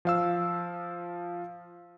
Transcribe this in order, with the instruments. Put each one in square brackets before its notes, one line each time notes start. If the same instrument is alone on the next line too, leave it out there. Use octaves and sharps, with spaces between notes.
[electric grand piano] F3 F5 E6